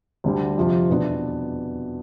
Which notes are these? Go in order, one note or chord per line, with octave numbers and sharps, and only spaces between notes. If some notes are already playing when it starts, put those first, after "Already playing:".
D2 D3 G3
F2 C3 F3
E2 B2 B3 D4